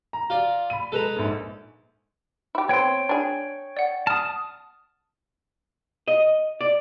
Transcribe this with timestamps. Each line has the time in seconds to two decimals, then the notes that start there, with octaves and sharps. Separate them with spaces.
0.13 A#5
0.30 F4 D5
0.70 B5 D#7
0.92 G#3 A4 B4 A#5
1.16 A#1 G#2
2.55 E4 G4
2.69 B3 C4 C#5 G5
3.09 D4 G#4
3.77 D5 F#5
4.07 A5 D#6 F6
6.08 D#5
6.61 D5